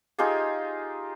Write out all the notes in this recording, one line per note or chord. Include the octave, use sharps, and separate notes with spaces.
D#4 F4 G4 G#4